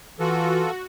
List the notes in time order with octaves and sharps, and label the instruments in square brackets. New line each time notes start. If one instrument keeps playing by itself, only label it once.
[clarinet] E3 [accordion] F4 A4 [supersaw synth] F#4